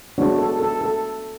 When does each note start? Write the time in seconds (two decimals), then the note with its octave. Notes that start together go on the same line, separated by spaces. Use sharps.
0.18 G#3 B3 D4 F#4 C#5
0.38 A4
0.60 A4
0.81 A4